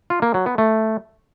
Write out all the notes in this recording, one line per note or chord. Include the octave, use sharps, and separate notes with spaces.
F4
A#3
F#3
B3
A3